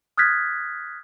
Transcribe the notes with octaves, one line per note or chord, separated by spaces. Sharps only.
D#6 F6 F#6 G#6 A6 B6